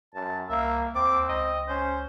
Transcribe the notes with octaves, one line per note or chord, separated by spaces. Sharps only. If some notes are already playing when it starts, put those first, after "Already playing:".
F#2 A5
C2 A#3 E5
D#2 C4 D6
C#2 D#5
C#4 C5